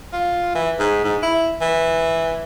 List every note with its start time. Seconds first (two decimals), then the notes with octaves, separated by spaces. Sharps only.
0.13 F4
0.55 E3
0.79 G#2
1.04 G#2
1.23 E4
1.61 E3